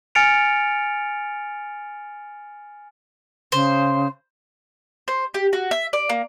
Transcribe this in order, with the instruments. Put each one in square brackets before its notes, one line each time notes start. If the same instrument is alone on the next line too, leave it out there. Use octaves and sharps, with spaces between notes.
[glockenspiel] G#5 F6 A6 C#7 D7 F7
[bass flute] C#3 [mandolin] C5
[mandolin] C5
G4
F#4
E5
D5
A#3